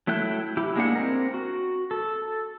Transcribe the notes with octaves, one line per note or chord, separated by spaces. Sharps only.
F#3 A3 E4 G5 F#6
E4 G4
G#3 A#3 D4 F#5
C4 A#4
F#4
A4